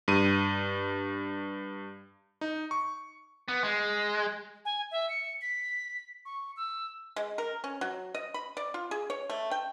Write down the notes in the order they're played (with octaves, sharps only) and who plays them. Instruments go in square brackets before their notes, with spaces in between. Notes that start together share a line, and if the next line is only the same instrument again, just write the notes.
[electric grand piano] G2 D#7
D#4
C#6
[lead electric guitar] B3
G#3
[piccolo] G#5
E5
C#7
B6
C#6
E6
[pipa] G#3
A#4
C#4
F#3
D#5
B5
D5
F4
G#4
C#5
A3
G5